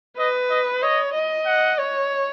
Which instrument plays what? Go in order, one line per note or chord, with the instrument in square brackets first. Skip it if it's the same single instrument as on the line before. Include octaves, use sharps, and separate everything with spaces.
[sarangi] B4 [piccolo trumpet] D#5
[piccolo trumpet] D#5
[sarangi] C#5 [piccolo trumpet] D#5
[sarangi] D#5
[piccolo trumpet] F#5
[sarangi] C#5